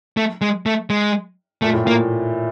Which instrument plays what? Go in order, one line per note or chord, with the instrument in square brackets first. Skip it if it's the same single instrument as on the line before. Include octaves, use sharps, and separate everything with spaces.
[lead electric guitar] A3
G#3
A3
G#3
[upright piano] A#2 [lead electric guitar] A3
[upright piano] A2
[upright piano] A#2 [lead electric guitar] A#3